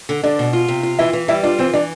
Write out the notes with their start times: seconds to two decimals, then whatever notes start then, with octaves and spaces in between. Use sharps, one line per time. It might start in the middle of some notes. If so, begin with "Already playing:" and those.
0.09 D3
0.23 D3 D4
0.39 B2
0.53 F4
0.68 C3
0.83 F4
0.99 E3 E4
1.13 E3
1.28 G3 E4
1.43 D4 F4
1.59 E3 C4
1.73 E3 D4